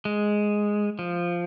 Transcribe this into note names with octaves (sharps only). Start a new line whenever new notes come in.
G#3
F3